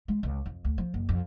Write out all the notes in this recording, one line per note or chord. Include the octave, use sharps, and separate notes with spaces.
G#3
C#2
F2
D2
F3
F#1
F2